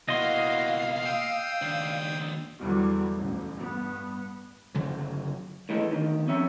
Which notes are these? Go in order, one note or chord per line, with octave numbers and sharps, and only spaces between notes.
B2 A#3 E4 F#4 D#5 F5 C6
G5 D#6 E6
D#2 D4
E2 D3 E3 F#3 G3
A1 D2
G2 B3
F#1 F#2 D3 F#3
A2 E3 G#3 A3
D2 D#3
F2 C#4 E5